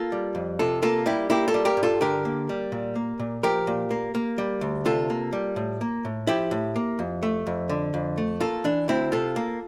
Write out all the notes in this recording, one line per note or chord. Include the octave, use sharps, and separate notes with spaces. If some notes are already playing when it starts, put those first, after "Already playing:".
Already playing: A#3 F4 A4
G3
F2
C3 F4 A4
A#3 F4 A4
G3 E4 G4
A#3 E4 G4
F4 A4
G3
G4 A#4
G2
F4 A4
D3 G4 A#4
A#3
G3
A#2
A#3
A#2
F3 G4 A#4
A#2
A#3
A#3
G3
D2
C3 F4 A4
A#3
G3
A2
A#3
A2
F3 E4 G4
A2
A#3
F2
A3
F2
D3
F2
A3
A#3 F4 A4
E3 D4
D2 C4 E4
C3 F4 A4
A#3